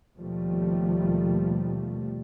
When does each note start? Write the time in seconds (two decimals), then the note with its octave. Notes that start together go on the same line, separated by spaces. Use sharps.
0.17 D#2 B2 F3 G3 A3